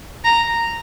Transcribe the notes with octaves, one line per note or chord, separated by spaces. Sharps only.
A#5